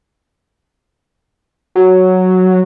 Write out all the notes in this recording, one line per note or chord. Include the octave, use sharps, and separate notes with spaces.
F#3